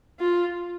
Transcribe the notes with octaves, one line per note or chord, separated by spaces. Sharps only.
F4